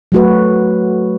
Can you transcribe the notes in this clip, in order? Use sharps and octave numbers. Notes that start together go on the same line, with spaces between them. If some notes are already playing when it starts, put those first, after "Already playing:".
F#3 A3 F#4 B4